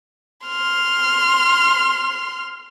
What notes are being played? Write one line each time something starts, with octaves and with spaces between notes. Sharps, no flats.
C6 F6